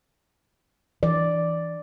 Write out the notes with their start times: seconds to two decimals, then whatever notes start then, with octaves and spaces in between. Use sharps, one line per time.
1.03 E3 D5